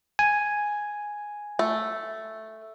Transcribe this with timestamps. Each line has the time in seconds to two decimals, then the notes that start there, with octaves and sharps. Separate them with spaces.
0.19 G#5
1.59 A3